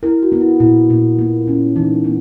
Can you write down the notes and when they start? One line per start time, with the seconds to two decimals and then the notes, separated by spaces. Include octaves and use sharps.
0.03 E4 A#4
0.22 F#4
0.32 B3
0.41 E4
0.60 A#2 E4
0.90 A#2
1.19 A#3
1.47 C#4
1.76 E3 D#4
2.04 B3